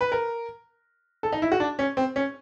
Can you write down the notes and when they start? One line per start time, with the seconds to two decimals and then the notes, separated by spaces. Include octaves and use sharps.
0.01 B4
0.12 A#4
1.23 A4
1.32 D#4
1.42 E4
1.52 F#4
1.60 D4
1.79 C#4
1.97 C4
2.16 C#4